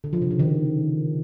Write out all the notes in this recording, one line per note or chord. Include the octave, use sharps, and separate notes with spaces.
D3
F3
C3
C#3
D#3